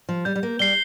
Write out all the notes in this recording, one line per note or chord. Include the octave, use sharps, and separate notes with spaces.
F3
G3 G6
G3
A#3
G3 C7 G7